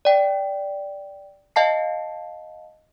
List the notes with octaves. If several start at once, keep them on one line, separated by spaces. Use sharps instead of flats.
D5 G5
D#5 F5 A5 C7